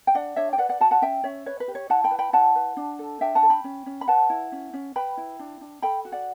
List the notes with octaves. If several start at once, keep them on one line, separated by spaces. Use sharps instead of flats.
G5
D4 D5 F#5
D4 C#5 E5
G5
B4 D5 F#5
D5 F#5
F#4 F#5 A5
F#5 A5
C#4 E5 G5
C#4 C#5 E5
B4 C#5
B4
G4
C#5
E4 F#5 A5
G5 B5
B4
G5 B5
E4 F#5 A5
B4
D4
A4
D4 E5 G5
F#5 A5
A4
G5 B5
C#4
C#4
B5
B4 F#5 A5
E4
C#4
C#4
B4 G5 B5
E4
D4
D4
A4 G5 B5
F#4
D5 F#5